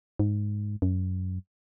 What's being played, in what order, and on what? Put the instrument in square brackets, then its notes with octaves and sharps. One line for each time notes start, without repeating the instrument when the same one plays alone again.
[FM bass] G#2
F#2